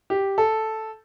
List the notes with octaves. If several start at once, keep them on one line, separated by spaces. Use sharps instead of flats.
G4
A4